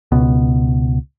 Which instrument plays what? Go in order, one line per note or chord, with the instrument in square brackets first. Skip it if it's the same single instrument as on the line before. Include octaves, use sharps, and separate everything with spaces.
[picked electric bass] C#2 B2